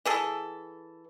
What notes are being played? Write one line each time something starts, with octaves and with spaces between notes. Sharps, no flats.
E3 G#4 A4